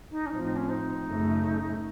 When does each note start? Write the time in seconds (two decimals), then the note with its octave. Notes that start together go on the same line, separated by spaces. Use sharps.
0.11 D#4
0.26 C#4
0.30 A2 F3 C4 D#4
0.43 D#4
0.56 C#4
0.69 D#4
1.07 F#2 C#3 A3